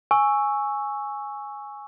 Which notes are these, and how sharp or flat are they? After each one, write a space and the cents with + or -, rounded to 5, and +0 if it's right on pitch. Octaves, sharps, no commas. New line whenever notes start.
G#5 +0 C#6 +0 E6 +0